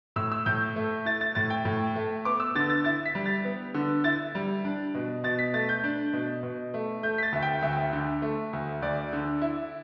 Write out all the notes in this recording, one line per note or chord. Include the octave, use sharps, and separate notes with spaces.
A2 E6
E6
A2 G6
A3
E4 A6
A6
A2 A6
G5
A2
A3
B3 D6
E6
D3 A6
A6
E4 A6
B6
G3
A6
B3
D3
E4 A6
G3
D4
B2
B2 A6
B6
A3 A6
G6
D4
B2
B2
A3
A3 G6
B6
A6
D2 E5
G5
D2 E5
D3
A3
D2
D2 D5
D3
E4